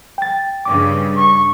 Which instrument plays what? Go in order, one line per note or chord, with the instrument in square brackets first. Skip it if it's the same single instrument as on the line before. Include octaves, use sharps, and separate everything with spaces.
[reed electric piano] G5 A6
[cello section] G2 C#3 [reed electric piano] D6
[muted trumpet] C#6